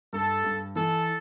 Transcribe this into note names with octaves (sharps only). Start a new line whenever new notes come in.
G2 A4
G2
E3 A4